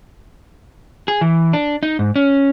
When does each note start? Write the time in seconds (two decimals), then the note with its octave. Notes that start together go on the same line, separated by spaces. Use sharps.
1.08 G#4
1.21 E3
1.53 D4
1.83 D#4
1.99 G#2
2.16 C#4